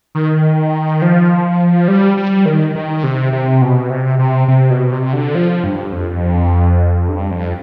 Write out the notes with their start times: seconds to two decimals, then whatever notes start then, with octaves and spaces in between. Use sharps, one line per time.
0.15 D#3
1.02 F3
1.88 G3
2.17 G3
2.46 D#3
2.75 D#3
3.04 C3
3.33 C3
3.62 B2
3.90 C3
4.19 C3
4.48 C3
4.71 B2
4.92 C3
5.13 D3
5.35 F3
5.64 G2
5.92 F2
7.09 G2
7.31 F2